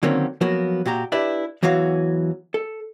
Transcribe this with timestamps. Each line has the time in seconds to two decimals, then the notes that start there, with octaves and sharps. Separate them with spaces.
0.03 D3 D#3 F#3 A#3 C4 C#4
0.41 F3 F#3 A#3 B3 F#4
0.86 A#2 F#4 G4 A#5
1.12 D4 E4 G4 B4 D5 E5
1.63 E2 E3 F#3 F#4 F5
2.54 A4